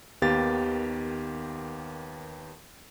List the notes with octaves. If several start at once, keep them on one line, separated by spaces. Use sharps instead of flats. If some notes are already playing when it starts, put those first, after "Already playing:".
D#2 D#3 B3 G4 F5 A6